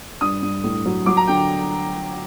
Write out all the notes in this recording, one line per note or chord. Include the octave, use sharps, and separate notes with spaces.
G2 D#6
G2
A2
F#3
F#3 D6
A#5
D3 G5